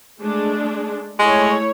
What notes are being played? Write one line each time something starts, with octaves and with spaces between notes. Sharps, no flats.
G#3 A3 D4
G#3 A3 E4 C#5